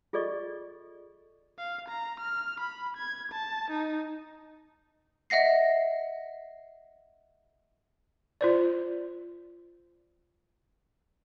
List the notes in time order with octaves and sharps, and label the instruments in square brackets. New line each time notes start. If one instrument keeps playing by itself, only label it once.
[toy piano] F4 G#4 A4 D5 D#5 C#6
[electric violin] F5
A#5
F6
B5
G#6
A5
D#4
[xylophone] D#5 E5 F#5 A#6 C7
[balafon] F4 C5 D5